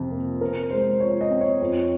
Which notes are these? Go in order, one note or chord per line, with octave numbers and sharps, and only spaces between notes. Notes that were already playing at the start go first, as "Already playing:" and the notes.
Already playing: F2 C3 F3
A#3
C3 A#4
G#3 C5
F3 C#5
D#5
C4
C#5
F2